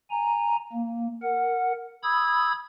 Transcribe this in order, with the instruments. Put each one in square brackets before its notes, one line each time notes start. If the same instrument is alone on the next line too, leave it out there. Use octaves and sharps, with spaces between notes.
[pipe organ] G#5 A#5
A#3
A#4 F#5
B5 D#6 E6 G#6